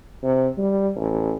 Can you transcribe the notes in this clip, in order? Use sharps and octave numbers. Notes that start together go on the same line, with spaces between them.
C3
G3
A1